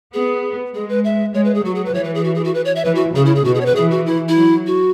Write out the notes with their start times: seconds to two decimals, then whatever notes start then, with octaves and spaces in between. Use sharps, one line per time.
0.14 B3 G#4
0.75 G#3 G#4
0.89 B4
1.05 E5
1.34 G#3 C#5
1.45 B4
1.55 G#4
1.65 F#3 F#4
1.75 G#4
1.85 B4
1.94 E3 C#5
2.04 B4
2.15 G#4
2.24 F#4
2.35 G#4
2.45 F#4
2.54 B4
2.65 C#5
2.76 E5
2.85 E3 B4
2.95 F#4
3.15 C#3 G#4
3.25 E4
3.35 G#4
3.45 B2 F#4
3.55 G#4
3.61 C#5
3.66 B4
3.76 E3 G#4
3.91 F#4
4.06 E4
4.28 E4
4.35 F#3
4.67 F#4